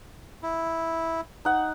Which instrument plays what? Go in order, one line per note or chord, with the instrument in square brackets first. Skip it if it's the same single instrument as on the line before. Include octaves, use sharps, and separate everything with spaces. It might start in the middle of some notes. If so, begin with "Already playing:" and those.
[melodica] E4
[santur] D#4 F#5